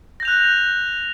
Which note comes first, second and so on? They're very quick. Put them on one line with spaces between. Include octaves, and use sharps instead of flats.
A#6 G6 F7 F#6